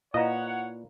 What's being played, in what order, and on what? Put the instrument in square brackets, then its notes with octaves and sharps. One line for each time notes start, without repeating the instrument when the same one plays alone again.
[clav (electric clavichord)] A#2 B4 [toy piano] E4 F5 A#5 [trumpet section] C#5 F#5 [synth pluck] D#5